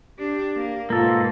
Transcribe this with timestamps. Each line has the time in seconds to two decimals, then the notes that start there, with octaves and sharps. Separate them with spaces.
0.19 D4 G4
0.56 A#3
0.90 G#2 B2 A#3 F4 A4